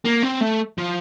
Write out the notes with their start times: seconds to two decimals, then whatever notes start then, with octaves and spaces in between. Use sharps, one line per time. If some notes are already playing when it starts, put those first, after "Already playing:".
0.05 A#3
0.23 C4
0.41 A3
0.78 F3